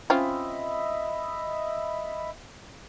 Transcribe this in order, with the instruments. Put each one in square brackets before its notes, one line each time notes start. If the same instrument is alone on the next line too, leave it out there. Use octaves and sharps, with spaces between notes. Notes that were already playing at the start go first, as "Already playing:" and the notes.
[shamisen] C4 C#4 F4 [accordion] D#5 E5 B5